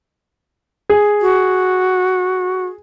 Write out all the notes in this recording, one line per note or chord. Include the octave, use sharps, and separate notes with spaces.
G#4
F#4